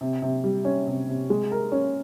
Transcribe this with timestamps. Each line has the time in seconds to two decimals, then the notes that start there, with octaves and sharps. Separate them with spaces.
0.01 C3
0.22 C3
0.44 G3
0.65 C#4
0.87 C3
1.09 C3
1.30 G#3
1.52 A#4
1.72 C#4